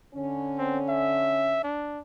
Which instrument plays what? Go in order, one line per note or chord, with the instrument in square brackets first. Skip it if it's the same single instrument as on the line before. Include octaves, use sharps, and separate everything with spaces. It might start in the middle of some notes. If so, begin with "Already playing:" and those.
[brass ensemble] D3 C#4
[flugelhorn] C4
E5
D4